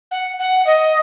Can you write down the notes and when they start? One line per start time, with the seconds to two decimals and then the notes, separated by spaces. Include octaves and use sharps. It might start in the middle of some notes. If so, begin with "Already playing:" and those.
0.11 F#5
0.39 F#5
0.66 D#5